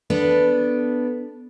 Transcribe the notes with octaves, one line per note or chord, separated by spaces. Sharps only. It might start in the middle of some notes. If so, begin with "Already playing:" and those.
B3 D4 A4